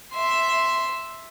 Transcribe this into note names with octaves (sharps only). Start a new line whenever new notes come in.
E5 C6